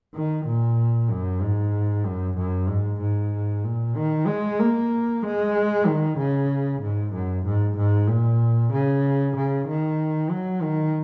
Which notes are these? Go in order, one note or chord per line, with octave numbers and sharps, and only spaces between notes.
D#3
A#2
F#2
G#2
F#2
F#2
G#2
G#2
A#2
D#3
G#3
A#3
G#3
D#3
C#3
G#2
F#2
G#2
G#2
A#2
C#3
C#3
D#3
F#3
D#3